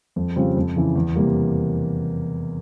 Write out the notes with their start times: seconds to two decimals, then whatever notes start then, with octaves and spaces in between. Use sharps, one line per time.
0.16 F2
0.36 C#3 G3 C4 F4
0.57 F2
0.76 C#3 E3
0.96 E2
1.16 C3 G3 A#3